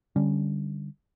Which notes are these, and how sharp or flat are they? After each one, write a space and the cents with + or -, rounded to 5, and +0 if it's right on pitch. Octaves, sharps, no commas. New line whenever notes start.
D3 +0 G3 +5 C#4 +0